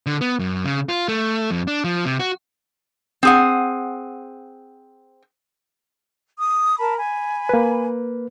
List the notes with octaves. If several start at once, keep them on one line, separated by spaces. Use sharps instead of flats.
D3
B3
F#2
C#3
F4
A3
F2
D4
F3
C3
F#4
C4 G#4 F#5
D#6
A#4 A5 B5
G#5 B5
A#3 B4